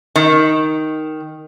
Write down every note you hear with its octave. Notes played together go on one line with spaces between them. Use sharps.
D#3